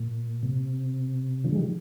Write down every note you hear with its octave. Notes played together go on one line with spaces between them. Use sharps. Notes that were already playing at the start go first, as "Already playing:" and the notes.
Already playing: A#2
C3
D3 F3
G#3
D#3 G3
F3